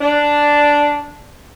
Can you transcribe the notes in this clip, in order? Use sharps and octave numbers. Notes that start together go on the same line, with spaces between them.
D4